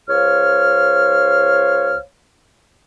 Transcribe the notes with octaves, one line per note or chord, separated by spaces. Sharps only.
C#2 C5 C#5 F5 F6